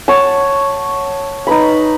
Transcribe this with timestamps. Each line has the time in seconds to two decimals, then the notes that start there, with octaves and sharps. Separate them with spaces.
0.08 C#5 F#5 A5
1.47 D#4 B4 B5